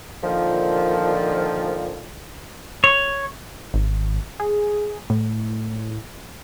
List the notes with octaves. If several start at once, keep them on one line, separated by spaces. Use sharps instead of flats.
A#2 D3 D#3 F3
C#5
G#1
G#4
A2